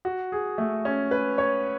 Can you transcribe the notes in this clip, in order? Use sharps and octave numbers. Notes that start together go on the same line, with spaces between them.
F#4
G#4
A3
C#4
B4
C#5